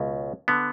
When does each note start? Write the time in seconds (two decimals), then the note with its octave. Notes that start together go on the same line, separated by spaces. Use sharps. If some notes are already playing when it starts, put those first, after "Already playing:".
Already playing: C#2 B2
0.48 D3 B3